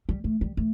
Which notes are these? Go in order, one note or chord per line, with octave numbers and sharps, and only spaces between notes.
G3
A3
G3
A3